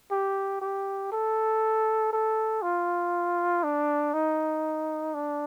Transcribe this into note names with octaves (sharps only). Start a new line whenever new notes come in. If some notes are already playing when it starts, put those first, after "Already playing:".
G4
G4
A4
A4
F4
D4
D#4
D4